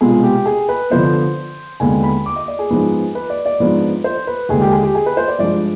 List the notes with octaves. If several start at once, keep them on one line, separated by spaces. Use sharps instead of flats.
C2 B2 G#3 B3 F4 G#4
G4
G#4
B4
D3 F3 B3 C5
D#2 D3 G#3 B3 G#5
B5
D6
D#5
D5
G#4
G#2 F3 B3 D#4
B4
D5
D5
G#2 F3 B3 D4
C5
B4
D#2 D3 G#3 G#4
G4
G#4
G4
G#4
B4
C5
D5
G2 F3 G#3 D4 D5